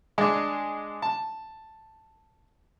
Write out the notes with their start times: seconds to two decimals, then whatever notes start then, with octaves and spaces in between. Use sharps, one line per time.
0.18 G#3 D4
1.02 A5